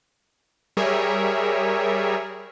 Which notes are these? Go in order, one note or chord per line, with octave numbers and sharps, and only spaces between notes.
G3 G#4 A#4 C#5 E5